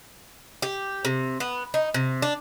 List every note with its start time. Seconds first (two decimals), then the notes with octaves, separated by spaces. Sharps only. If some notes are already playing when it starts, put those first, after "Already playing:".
0.62 G4
1.05 C3
1.40 B3
1.74 D#4
1.94 C3
2.22 D4